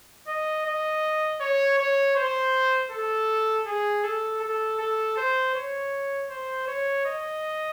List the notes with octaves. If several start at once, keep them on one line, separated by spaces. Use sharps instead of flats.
D#5
D#5
C#5
C#5
C5
A4
G#4
A4
A4
A4
C5
C#5
C5
C#5
D#5